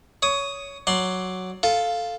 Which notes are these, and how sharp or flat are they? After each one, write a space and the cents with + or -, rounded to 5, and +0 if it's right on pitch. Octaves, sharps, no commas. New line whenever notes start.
C#5 +15 D#6 +0
F#3 +0 D5 +0 C6 +15
F4 +0 A4 +0